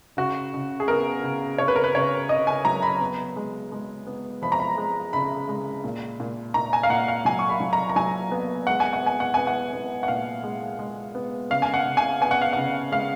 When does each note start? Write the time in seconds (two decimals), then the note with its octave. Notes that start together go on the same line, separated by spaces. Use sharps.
0.17 C#3 F#4
0.53 C#3
0.80 G#4
0.88 B3 A#4
1.24 C#3
1.58 C#3 C#5
1.68 B4
1.76 A#4
1.84 B4
1.95 C#3 C#5
2.29 C#3 D#5
2.47 G#5
2.65 F#3 A#5
2.83 B5
3.01 B3
3.36 G#3
3.72 G#3
4.07 B3
4.42 F3 B5
4.52 A#5
4.60 B5
4.78 G#3
5.13 C#3 B5
5.49 G#3
5.84 A#2
6.20 A#2
6.54 A#2 A#5
6.73 G#5
6.83 F5
6.90 A#2 F#5
7.08 F5
7.25 F#3 G#5
7.39 C#6
7.49 B5
7.60 F#3
7.73 A#5
7.90 A#5
7.96 F#3 G#5
8.31 B3
8.67 G#3 F#5
8.80 G#5
8.93 F#5
9.03 B3 G#5
9.20 F#5
9.34 B3 G#5
9.47 F#5
9.73 B3
10.03 F#5
10.08 A#2 F5
10.44 G#3
10.79 G#3
11.15 B3
11.50 C#3 F5
11.62 G#5
11.74 F#5
11.86 C#3
11.97 G#5
12.21 B3 G#5
12.31 F#5
12.42 F5
12.53 C#3 F#5
12.92 G#3 F5